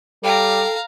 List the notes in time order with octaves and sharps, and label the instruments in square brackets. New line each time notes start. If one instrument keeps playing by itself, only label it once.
[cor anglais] G3 [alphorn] A4 [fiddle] F5 A#5 [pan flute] G5